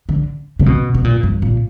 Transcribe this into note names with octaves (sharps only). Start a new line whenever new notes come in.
D3
C#3
B2
B2
A#2
G2
A#2